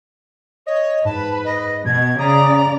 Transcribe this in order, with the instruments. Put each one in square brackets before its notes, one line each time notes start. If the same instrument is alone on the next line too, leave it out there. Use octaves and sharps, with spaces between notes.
[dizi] C#5 [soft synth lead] D#5
[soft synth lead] G#2 [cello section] B4 [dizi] A5
[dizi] D#5
[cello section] B2 [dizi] G#6
[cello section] C#3 D5 [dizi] A#5 [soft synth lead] D#6